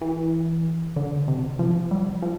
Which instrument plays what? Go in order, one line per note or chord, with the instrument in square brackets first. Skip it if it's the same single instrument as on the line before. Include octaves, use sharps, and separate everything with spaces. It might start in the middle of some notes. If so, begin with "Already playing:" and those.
[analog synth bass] E3
D3
C3
F3
G3
F3